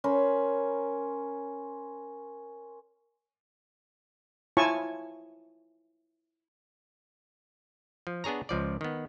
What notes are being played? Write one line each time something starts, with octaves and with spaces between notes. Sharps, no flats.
C#4 A#4 C5 B5
E4 F4 C#5 G#5 A5 C#6
F3
B3 D4 G#4 C#5 A#5
C#2 F3 D5
D#3 B3